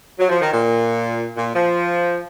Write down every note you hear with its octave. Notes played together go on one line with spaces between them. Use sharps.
F#3
F3
D#3
A#2
A#2
F3